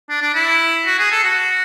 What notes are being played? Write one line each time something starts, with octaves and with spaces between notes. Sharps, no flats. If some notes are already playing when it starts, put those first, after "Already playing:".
D4
D4
E4
F#4
G#4
A4
F#4